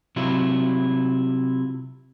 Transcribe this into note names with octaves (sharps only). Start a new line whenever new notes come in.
C3 F#3 E4 F4